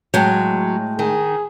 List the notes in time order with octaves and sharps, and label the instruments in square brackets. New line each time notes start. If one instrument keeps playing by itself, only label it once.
[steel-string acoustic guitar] A2 G#3 [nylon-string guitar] F#3 [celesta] G5 A5 G6
[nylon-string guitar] D#3 [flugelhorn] G#4